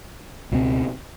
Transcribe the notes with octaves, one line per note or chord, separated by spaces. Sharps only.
C#2 B2 G#3 C4